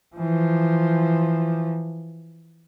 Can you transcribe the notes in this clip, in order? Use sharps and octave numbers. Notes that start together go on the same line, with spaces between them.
E3 F3